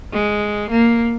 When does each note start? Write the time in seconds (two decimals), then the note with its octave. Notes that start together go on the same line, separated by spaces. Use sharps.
0.13 G#3
0.71 A#3